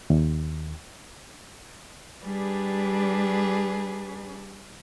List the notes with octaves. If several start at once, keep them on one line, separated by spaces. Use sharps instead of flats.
D#2
G3 D4 G4 G#4 B4